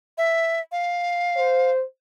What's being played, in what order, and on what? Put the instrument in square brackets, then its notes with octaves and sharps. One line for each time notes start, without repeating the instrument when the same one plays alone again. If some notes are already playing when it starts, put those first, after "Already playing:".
[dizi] E5
F5
[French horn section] C5